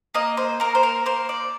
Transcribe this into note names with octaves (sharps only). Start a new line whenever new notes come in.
A#3 D#5
C5
A#3 A#4
C5
A#4
A#3 C5
D5